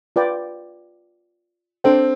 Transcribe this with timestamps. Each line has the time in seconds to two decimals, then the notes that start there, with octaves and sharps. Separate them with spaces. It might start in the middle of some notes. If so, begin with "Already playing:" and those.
0.16 F4 B4 D5 G5
1.84 C4 D4 A4 C5 G5